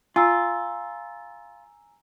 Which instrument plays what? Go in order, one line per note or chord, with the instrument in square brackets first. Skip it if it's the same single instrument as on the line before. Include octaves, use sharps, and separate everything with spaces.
[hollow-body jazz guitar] F4 [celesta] G#5 A#5 E6